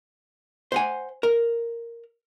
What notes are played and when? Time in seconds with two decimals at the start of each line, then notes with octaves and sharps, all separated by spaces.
0.72 C5 F#5 G#5
1.23 A#4